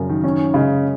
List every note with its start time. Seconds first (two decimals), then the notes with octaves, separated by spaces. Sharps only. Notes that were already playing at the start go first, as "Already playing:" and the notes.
Already playing: F#2 C#3
0.09 D#3
0.24 D#3 C#4
0.54 C#3 G#3